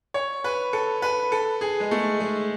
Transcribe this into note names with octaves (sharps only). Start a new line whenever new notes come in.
C#5
B4
A4
B4
A4
G#4
G#3
A3
G#3